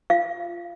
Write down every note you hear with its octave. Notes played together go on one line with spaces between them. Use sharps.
F4 F5